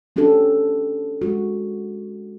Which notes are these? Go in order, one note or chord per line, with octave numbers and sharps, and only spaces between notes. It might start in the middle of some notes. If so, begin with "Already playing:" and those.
A3 C#4 D4 G4 A4
G#3 F#4